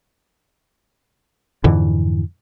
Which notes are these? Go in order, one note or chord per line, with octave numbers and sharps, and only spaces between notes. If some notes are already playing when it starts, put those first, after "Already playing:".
F2 G#2 D3 E3